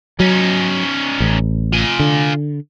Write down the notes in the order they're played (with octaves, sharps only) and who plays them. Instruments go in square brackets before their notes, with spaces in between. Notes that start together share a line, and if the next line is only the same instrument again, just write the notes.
[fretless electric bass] F#3 [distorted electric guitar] C#4 D#4
[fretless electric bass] A1
[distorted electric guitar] F4 G#5
[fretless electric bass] D3